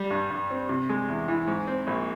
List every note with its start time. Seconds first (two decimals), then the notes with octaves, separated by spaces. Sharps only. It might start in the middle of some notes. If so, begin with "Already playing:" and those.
Already playing: G3
0.11 G2
0.30 G2
0.50 C4
0.69 C3
0.89 G#3
1.09 E2
1.28 E3
1.47 G#2
1.67 C4
1.87 A#1